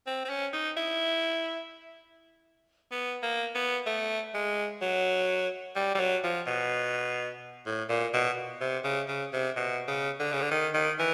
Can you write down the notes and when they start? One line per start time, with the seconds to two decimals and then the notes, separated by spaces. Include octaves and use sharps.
0.07 C4
0.25 C4
0.29 C#4
0.53 D#4
0.77 E4
2.91 B3
3.23 A#3
3.55 B3
3.86 A3
4.34 G#3
4.81 F#3
5.75 G3
5.95 G3
6.00 F#3
6.24 F3
6.47 B2
7.66 A2
7.89 A#2
8.13 B2
8.61 C3
8.84 C#3
9.08 C#3
9.33 C3
9.56 B2
9.87 C#3
10.20 D3
10.32 C#3
10.42 D3
10.51 D#3
10.74 D#3
10.99 E3